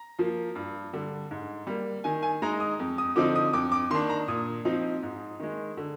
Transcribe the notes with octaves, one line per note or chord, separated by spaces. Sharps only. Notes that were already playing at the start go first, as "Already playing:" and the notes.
Already playing: A#5
F3 A#3
G2
D3 G3
G#2
G3 A#3
D#3 G#5
G#5
G#3 D#4 A#5
D#6
F2
D#6
D3 F3 C4 D#4 D6
D#6
F2 D6
D6
D#3 A#3 D4 C6
A#5
A#2 D#6
F3 C4 D#4
G#2
D#3 G#3
D3